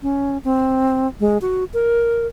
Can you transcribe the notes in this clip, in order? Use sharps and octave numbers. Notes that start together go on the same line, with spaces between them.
C#4
C4
G#3
F#4
A#4